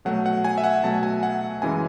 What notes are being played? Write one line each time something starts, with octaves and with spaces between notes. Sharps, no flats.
B2 F#3 A3 F#5
F#5
G#5
E5
F#5
B2 F#3 A3 A5
G#5
F#5
F#2 C#3 E3 G#3 G#5